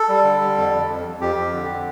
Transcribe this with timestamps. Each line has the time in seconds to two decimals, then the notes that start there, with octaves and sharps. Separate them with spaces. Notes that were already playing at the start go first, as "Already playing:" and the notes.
Already playing: A4
0.09 G3
0.24 D3
0.41 G3
0.57 F2
0.73 F2
0.88 F2
1.05 F2
1.20 F2 G4
1.36 F2
1.53 D3